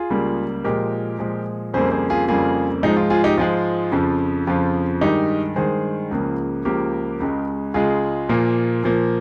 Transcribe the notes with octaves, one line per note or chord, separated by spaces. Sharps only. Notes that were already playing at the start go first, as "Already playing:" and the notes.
Already playing: F4 G#4
C#2 C#3 G3 A#3
A#2 F3 G#3 G4 A#4
A#2 F3 G#3
F2 C#3 G3 A#3 G#4 C5
G#4 C5
F4 G#4
F2 C#3 G3 A#3 F4 G#4
G#2 F3 G#3 D#4
F4
F4 G#4
D#4 G4
G#2 F3 G#3 F4
F2 C#3 F3
F2 C#3 F3 F4
G2 D#3 G#3 D#4 G4
G2 D#3 G#3 G#4 C5
C#2 C#3 F3 A#3
C#2 C#3 F3 A#3 G4 A#4
C#2 C#3 G#3
C#2 C#3 G#3 F4 G#4
A#2 F3 A#3
A#2 F3 A#3